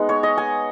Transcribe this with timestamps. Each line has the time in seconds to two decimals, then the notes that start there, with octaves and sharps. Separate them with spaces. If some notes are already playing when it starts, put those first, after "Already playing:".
Already playing: G#3 B3 D#4
0.09 C#5
0.23 D#5
0.38 G#5